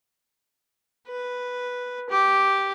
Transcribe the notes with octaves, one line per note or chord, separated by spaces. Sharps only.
B4
G4 D6